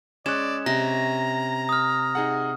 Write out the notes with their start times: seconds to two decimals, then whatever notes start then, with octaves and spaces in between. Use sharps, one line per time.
0.26 G#3 C#4 D5 C#6 F#6 G#6 E7
0.66 C3 A#5 A#6
1.69 D#6 F6
2.15 D#4 G#4 F#5